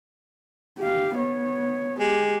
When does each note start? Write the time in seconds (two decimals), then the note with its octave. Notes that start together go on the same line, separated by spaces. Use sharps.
0.79 G4 F5
1.15 B3 C#5
2.00 G#3 G4